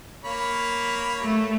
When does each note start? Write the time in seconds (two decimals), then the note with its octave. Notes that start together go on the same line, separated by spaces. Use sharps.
0.24 A#3 C#5 B5
1.22 A3